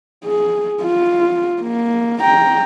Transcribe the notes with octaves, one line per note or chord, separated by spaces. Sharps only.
G#4
F4
A#3
G5 A#5